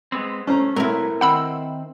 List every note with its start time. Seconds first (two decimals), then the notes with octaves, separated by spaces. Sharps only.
0.12 G#3 B3 C4
0.47 A3 C#4 C5 A#5
0.76 B1 F#3 A3 C4 E4 A#4
1.21 D#3 C4 C5 F#5 B5 E6